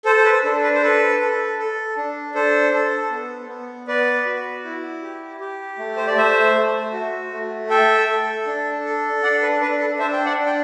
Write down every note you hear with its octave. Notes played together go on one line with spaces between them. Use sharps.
A4 C5
C5
B4
D4 A4
B4
C5
A4 B4
A4
A4
D4
D4 A4 C5
A4
B3
B3
B3 B4 D5
F#4
E4
G4
G4
A3
C5
D5
A3 C5 E5
A3
F#4
A3
A4 E5 G5
A4
D4
A4
D4 D5 F#5
B4
D4 B4
A4
D4 C5 E5
G5
D5 F#5
D4
G5